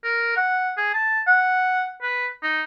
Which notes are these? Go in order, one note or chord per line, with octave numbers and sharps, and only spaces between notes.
A#4
F#5
G#4
A5
F#5
B4
D#4